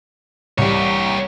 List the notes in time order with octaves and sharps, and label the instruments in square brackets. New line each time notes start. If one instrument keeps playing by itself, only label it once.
[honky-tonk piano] C2 G3 [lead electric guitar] G4 C#5